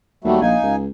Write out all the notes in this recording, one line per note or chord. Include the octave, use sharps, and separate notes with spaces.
D#2 F#3 G3 A3
A#1 D#4 F5 G#5
C#2